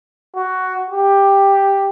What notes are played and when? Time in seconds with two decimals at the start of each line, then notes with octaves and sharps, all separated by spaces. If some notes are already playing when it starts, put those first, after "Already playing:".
0.36 F#4
0.91 G4